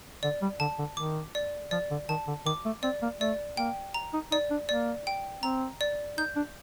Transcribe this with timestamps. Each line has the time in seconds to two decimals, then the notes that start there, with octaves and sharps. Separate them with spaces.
0.23 D3 D5
0.42 G3
0.60 D3 A5
0.79 D3
0.97 D#3 D6
1.35 D5
1.71 F3 D5
1.91 D3
2.09 D#3 A5
2.27 D3
2.46 D#3 D6
2.65 A3
2.83 C4 D5
3.02 A#3
3.20 A3 D5
3.57 A#3 G5
3.94 A#5
4.13 D#4
4.31 D#4 D5
4.51 D4
4.69 A#3 D5
5.07 G5
5.43 C4 A#5
5.81 D5
6.17 D#4 G6
6.36 D4